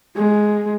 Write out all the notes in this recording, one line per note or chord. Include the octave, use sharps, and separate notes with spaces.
G#3